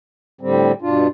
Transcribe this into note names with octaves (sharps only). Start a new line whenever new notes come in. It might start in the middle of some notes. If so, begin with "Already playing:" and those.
A2 D3 G3 C4
G2 B2 D4 F4